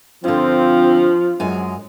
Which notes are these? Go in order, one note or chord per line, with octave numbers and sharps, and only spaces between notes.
G2 D3 F3 C4 F4
F#2 F#3 G#3 G#5